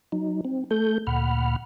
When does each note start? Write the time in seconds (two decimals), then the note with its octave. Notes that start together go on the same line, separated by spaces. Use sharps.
0.12 F#3 D#4
0.45 C4
0.71 A3 A4 G6
1.07 D2 A#2 F#5 B5 F6